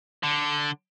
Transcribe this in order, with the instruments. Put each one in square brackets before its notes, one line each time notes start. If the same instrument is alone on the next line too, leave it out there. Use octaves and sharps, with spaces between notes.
[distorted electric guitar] D3